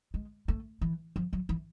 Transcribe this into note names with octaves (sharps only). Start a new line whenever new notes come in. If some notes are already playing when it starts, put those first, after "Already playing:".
G#3
A3
E3
F3
F#3
E3